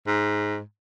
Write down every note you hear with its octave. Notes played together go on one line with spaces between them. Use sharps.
G#2